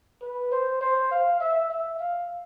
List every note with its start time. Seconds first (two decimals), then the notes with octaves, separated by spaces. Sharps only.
0.22 B4
0.52 C5
0.81 C5
1.11 F5
1.40 E5
1.70 E5
1.99 F5